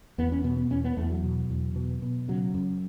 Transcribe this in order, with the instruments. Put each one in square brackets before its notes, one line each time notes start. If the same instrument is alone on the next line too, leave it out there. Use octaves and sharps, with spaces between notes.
[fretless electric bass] E2 B3
C#4
B2 B3
B3
E2 C#4
B3
E2 A3
F#3
B2
E2
B2
B2
C#3 F#3
F#2